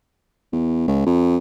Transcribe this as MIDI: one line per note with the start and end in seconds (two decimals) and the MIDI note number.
0.52 0.84 40
0.88 1.04 37
1.06 1.37 41